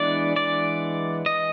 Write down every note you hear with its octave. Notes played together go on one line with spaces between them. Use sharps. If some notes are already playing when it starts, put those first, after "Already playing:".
Already playing: E3 G#3 B3 D4 D5
D5
D#5